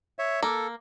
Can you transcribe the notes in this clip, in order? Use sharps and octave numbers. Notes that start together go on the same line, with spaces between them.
C#5 E5
A#3 A4